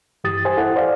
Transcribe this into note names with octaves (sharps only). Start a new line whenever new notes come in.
G2 E3 G4 D#6 A6
G4 C5 G#5
E4 A4 F#5
C5 D5 F5